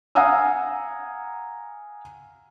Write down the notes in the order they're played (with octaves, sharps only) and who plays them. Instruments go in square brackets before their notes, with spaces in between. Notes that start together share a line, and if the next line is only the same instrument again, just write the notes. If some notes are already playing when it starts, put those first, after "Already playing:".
[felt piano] F5 F#5 G#5 A#5 D#6 E6